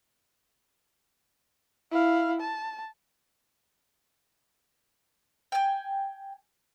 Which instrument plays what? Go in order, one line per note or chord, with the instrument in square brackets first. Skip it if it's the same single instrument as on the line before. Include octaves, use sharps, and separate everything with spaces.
[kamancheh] E4 F5
A5
[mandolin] G5 G#5